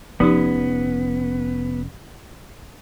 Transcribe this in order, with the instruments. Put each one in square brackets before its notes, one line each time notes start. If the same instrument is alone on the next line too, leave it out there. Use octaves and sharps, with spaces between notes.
[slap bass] F1 C#4 [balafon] F3 D#4 G4 [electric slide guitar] B3